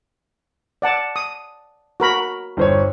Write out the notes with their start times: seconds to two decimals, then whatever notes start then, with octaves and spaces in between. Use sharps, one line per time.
0.82 D5 F#5 A5
1.16 D#6
2.00 F#4 A#4 B5
2.57 G1 C5 C#5